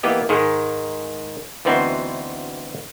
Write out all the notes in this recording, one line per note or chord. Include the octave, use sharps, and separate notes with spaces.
E3 A#3 B3 G4 D#5
G#2 D#3 G#3
D2 E3 B3 C4 D#4 F#4